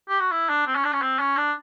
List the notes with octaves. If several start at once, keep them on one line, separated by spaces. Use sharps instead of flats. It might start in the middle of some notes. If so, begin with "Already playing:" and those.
G4
F#4
E4
D4
C4
C#4
D4
C#4
C4
C#4
D4